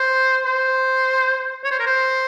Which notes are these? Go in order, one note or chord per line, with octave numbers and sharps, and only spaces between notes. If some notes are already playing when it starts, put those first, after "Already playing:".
Already playing: C5
C5
C#5
C5
A#4
C5